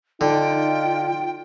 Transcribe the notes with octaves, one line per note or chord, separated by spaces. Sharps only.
D3 D#4 F4 G5